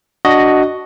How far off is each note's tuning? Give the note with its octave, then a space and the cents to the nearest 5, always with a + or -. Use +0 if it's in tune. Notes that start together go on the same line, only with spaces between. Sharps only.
D4 -5 F#4 +5 D#5 +0